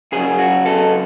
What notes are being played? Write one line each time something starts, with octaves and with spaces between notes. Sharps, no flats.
C#3 F#3 G#4
F#4
A4